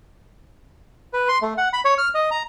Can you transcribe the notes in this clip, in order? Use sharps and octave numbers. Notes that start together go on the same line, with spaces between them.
B4
C6
A3
F#5
B5
C#5
F6
D#5
A#5